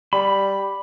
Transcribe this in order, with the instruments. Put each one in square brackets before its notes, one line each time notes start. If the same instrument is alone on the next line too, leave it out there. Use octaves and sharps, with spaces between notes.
[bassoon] G3 [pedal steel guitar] B5